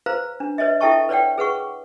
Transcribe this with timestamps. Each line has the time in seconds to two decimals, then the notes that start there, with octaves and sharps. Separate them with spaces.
0.06 B4 C5 F5 A#5
0.40 D4
0.58 B4 C#5 D#5 E5
0.81 E4 A4 E5 G5 A5 C#6
1.09 B4 C#5 D5 F#5 G5
1.38 G#4 B4 F#5 C#6